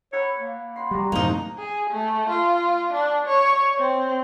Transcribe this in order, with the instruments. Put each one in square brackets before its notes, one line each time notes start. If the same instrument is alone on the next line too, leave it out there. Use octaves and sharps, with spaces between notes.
[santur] A4 F#5 B5 [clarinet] C#5
[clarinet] A#3
[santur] F#5 B5 C6
[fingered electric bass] G3 [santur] F#4 D5 A#5
[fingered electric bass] F#2 A2 C3 [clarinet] F3 [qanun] A#3 D#4 [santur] A#4 C5
[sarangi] G#4
A3
F4
D4
C#5
C4